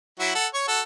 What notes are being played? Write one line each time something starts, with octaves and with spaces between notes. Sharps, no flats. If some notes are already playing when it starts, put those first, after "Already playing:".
F#3 E4 F#4
A4 F#5
C#5 C#6
F#4 A4